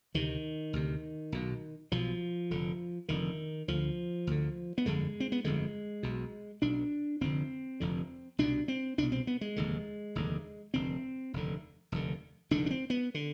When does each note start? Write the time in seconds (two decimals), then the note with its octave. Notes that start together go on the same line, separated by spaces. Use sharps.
0.14 D2 C3 D#3
0.73 D2 C3
1.32 B1 B2
1.92 B1 B2 F3
2.50 F1 F2 D3
3.09 F1 F2 D3 D#3
3.68 D2 D3 F3
4.27 D2 D3
4.78 B3
4.86 G1 F2 D3 G#3
5.20 C4
5.32 B3
5.44 G1 F2 D3 G#3
6.03 B1 B2
6.62 B1 B2 D4
7.21 F1 F2 D3 C4
7.80 F1 F2 D3
8.38 C2 B2 D4
8.68 C4
8.98 C2 B2 D4
9.12 C4
9.27 B3
9.41 G#3
9.56 F1 D#2 D3
10.15 F1 D#2 D3
10.74 F1 D#2 D3 C4
11.33 F1 D#2 D3
11.92 F1 D#2 D3
12.51 F1 D#2 D3 D4
12.66 D4
12.71 C4
12.90 B3
13.14 D3